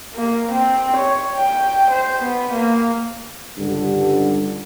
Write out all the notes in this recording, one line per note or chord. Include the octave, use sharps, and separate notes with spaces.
A#3
C4
C#5
G5
C5
B3
A#3
C#2 G2 D3